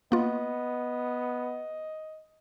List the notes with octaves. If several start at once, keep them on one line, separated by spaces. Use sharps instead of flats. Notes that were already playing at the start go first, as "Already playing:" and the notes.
A#3 B3 F4 D#5